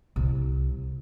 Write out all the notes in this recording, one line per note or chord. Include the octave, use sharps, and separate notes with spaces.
C2